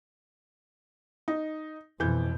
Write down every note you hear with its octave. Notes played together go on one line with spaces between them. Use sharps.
D#4
F2 B2 E3 G6